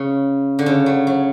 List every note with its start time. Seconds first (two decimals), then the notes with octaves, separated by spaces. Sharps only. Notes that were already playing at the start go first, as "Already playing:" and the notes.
Already playing: C#3
0.59 D3
0.66 C#3
0.86 F#3
1.07 F#3